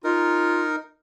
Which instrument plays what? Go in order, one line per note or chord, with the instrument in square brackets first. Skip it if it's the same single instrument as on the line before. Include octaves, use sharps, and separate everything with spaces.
[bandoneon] D#4 A#4 [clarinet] F4